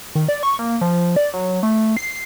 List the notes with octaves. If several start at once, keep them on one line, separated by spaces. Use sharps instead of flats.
D#3
D5
C#6
A#3
F3
D5
F#3
A3
C7